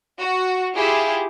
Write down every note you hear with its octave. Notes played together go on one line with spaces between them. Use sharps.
F#4
E4 F4 G4 G#4